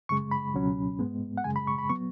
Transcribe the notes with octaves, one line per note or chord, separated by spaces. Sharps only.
F#2 C#3 G#3 C#6
B5
C#2 B2 F#3 C#4
G#2 G#3 B3
F#5
F#2 C#3 G#3 G#5
B5
C#6
B5
F#3 B3 C#6